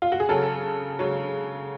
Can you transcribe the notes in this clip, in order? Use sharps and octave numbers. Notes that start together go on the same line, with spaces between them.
F4
F#4
G#4
C#3 F#3 A4
C#3 F#3